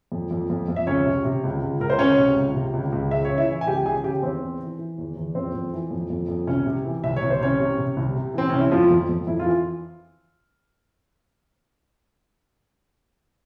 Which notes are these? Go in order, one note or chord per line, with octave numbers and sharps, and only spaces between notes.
F2
F2
F2
F2
E5
C#2 C#4 C#5
C3
C3
C#2
C#2
C#2 A#4
C5
C#2 C#4 C#5
C3
C#2
C3
C#2
C#2
C#3 E5
C#5
C#3
E4 E5
E3
G#5
C#2 G4 G5
C#3 G#4 G#5
C#3 G4 G5
E2 C4 C5
E3
E3
E3
E2
E2
F2 C4 C5
F2
E3
F2
F2
F2
C2 C#4 C#5
C3
E3
C2 E5
C#5
C2
C5
C2 C#4 C#5
C3
C3
C2
C3
E3 C4
C2 C#4
E4
F2 F3 F4
F2
F2
F2 E4
F4
E3